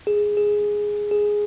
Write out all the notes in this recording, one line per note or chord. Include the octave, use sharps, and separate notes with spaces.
G#4
G#4
G#4